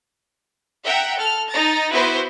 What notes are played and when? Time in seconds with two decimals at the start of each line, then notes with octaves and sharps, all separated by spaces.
0.83 E5 F#5 G5 A#5
1.18 A4 F6
1.51 D#4 A#5 A6
1.90 B3 E4 F#4 B4 C5